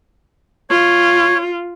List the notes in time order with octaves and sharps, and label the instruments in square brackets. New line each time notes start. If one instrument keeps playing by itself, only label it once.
[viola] F4 [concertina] C#5